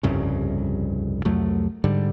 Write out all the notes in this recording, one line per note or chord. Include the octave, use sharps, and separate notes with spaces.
F1 C2 G2 C#3
C2 F2 F#3 A3
G#2 D3 G3